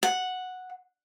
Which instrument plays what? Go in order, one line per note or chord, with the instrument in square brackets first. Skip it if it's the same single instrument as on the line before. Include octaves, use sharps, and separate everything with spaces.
[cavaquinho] F#5